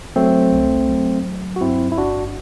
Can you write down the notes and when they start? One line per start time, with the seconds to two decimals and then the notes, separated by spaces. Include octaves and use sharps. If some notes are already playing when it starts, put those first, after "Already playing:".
0.16 F#3 A3 C4
0.52 C2
0.89 F#3
1.26 F#3
1.56 F#4
1.61 G2 C4 E4
1.92 E4
1.97 G1 D4 F#4